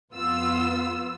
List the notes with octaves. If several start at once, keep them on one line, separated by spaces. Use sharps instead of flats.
F2 B3 F4 E6